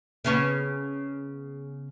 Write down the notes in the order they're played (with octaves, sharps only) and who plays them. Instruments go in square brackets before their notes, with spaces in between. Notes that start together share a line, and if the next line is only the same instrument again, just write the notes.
[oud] C#3 B3 C#4